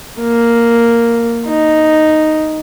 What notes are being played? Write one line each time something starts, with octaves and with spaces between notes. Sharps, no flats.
A#3
D#4